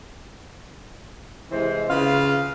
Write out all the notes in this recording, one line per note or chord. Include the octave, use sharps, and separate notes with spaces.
C3 E3 G#3 C5
C#3 F4 B4 F5